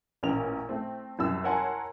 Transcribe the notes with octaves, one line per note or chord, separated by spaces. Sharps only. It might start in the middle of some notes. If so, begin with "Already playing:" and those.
A1 A#2 C#4 A#4 F7
A3 C4
C2 F#2 E6
A#4 C#5 F#5 G#5 A5 C6